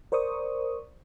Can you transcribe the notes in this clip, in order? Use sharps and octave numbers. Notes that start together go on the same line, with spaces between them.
A#4 C5 D5 C#6 D#6